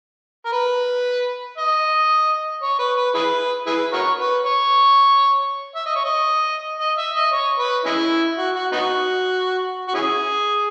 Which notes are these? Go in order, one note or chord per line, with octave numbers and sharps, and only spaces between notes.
A#4
B4
D#5
C#5
B4
B4
E4 G#4 B4
E4 G#4 B4
F#4 A#4 C#5
B4
C#5
E5
D#5
C#5
D#5
D#5
E5
D#5
C#5
B4
G#3 C#4 E4
F#4
F#4
B3 D#4 F#4
F#4
C#4 E4 G#4